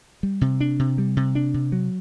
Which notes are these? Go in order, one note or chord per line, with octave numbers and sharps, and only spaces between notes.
G3
C3
D4
C3
G3
C3
D4
C3
F#3